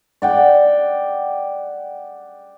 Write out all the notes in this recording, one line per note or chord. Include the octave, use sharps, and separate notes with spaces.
D5 F#5 G5